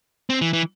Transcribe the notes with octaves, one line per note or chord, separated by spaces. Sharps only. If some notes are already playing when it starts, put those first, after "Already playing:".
C4
E3
E3